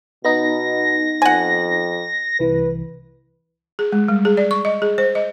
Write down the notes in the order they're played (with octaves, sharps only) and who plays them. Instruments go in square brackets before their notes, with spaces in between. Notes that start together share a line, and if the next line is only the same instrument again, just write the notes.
[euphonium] B2 [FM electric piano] B3 D#4 [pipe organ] A#6
[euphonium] F2 [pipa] F#5 G#5
[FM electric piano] C2 E3 [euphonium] B4
[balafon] G#4
G#3
G3
G#4
D5
C#6
D#5
G#4
C5
D#5